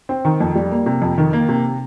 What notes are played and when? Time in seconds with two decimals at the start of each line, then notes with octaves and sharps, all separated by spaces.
0.09 C4
0.25 D#3
0.40 F2
0.55 G3
0.71 A#3
0.86 C3
1.02 F2
1.18 D#3
1.33 A#3
1.49 C3